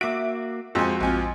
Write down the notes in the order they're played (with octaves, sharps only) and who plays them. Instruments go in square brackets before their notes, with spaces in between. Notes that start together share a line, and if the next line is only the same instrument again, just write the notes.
[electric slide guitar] A#3 F#4 [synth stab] E5 [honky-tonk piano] D6 D7
[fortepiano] F2 [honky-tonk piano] G#3 G#5 [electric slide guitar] F#4 C5
[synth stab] A#1 G#5 [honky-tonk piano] G#2 C4 F4